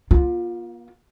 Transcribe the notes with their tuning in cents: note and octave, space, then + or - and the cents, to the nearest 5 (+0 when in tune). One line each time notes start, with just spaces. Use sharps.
A#3 +40 F4 +0